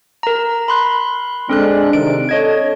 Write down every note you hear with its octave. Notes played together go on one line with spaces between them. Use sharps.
A#4 A#5
B5 C6 F#6
G#3 C4 D4 A4 F#6
C3 D#3 D7
D4 A4 C#5 D#5 G#6